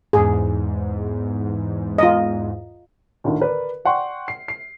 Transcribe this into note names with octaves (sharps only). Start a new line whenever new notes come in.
E2 G#2 G#4
F4 D#5
D2 A2 D3 D#3
A#4 B4 D5
D5 F#5 G5 C6 C#6
C7
C7